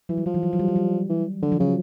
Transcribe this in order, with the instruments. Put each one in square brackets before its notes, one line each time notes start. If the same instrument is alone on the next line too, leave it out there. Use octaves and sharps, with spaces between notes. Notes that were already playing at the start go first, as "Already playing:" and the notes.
[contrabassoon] E3 [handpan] F#3
[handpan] G3
[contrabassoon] F3 [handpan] F#3
[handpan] E3
F#3
F#3
G3
F#3
G3
[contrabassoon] E3
[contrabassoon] D3 [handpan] F#3
[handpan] F3
[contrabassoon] C#3 [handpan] F#3